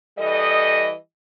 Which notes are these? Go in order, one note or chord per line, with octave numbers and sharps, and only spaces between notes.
E3 G3 A4 D#5